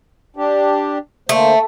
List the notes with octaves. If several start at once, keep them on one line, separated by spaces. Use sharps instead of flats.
D4 G4
D3 A3 A#3 C5